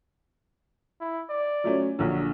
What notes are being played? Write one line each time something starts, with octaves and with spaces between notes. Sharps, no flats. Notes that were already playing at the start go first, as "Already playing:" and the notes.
E4
D5
F#3 A3 C#4
A#1 D3 F#3